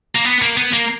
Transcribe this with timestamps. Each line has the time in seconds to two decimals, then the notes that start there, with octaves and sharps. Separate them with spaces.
0.15 A#3
0.25 B3
0.42 A#3
0.57 B3
0.73 A#3